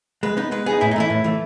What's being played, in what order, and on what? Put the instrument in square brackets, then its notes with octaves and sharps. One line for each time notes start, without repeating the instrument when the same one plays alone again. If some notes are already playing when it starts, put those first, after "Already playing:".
[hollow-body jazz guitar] G#3 [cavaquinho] B4
[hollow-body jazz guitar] B3 D#4 [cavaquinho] B4
[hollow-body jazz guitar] G#3 [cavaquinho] B4
[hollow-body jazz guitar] B3 D#4 [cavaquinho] G#4
[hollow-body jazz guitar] A2 [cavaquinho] E4
[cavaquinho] D#4
[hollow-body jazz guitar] E3 A3 [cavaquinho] E4
[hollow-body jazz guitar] A2
E3 A3